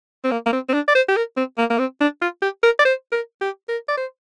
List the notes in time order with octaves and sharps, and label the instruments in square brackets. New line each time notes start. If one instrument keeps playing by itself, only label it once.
[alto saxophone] C4
A#3
A#3
C4
C4
D4
D5
C5
G4
A#4
C4
A#3
A#3
C4
D4
F4
G4
A#4
D5
C5
A#4
G4
A#4
D5
C5